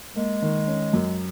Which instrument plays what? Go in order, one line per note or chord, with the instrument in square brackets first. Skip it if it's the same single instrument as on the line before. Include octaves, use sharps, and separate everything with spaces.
[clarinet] G#3 [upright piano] A#3
[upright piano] D#3
C#4
F#2